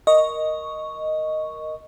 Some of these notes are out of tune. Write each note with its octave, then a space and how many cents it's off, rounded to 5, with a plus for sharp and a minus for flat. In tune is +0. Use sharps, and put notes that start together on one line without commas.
A#4 +0 D#5 +0 C#6 +0